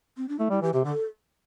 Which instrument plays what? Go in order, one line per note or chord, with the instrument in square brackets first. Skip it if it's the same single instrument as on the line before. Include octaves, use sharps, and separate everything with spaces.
[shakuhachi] C4
D4
[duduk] A3 [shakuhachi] E4
[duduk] G3 [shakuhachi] E4
[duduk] E3 [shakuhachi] G4
[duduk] C3 [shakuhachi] G4
[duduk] D3 [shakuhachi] A4